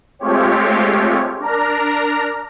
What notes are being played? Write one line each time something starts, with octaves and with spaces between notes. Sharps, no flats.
G#3 A3 C4 F4 G4 C#5
D4 A#4 A#5